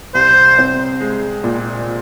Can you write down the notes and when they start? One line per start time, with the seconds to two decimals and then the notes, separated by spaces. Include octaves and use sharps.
0.15 C2 C5
0.59 C4
1.01 G#3
1.44 A#2